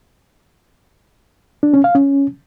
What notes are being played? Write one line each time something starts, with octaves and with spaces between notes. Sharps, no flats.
D4
C#4
F5
C#4